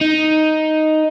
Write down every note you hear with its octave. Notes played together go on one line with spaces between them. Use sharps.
D#4